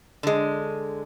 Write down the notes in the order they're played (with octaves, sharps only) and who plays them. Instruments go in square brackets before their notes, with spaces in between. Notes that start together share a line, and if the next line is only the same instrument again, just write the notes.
[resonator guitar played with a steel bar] D3 G#3